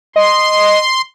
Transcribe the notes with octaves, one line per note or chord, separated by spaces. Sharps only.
D#5 C6